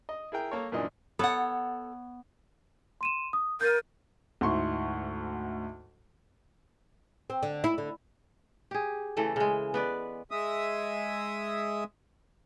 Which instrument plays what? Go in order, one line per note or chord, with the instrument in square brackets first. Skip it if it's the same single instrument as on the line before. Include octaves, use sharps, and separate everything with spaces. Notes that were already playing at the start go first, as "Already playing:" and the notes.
[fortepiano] D#5
E4 G#4 A#4 G5
A#3 A4 A#4 C#5
F#2 A#2 E3 D4 D#5
[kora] B3 C#5 [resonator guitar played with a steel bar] A4 F#5
[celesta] C6 D#7 E7
D#6
[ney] A#4 [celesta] G6 A6 D#7
[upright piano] D2 G#2 E4 C6 C#6
[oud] C4
D3
E4
D3
[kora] G4 G#4
C#3 E3 A3 A4
C#3 G#3
B3 B4 D5
[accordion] G#3 E5 D#6